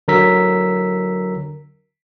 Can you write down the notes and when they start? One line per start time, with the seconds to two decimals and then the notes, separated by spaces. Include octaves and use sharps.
0.08 D3 F#3 A#4 A#5 E6 B6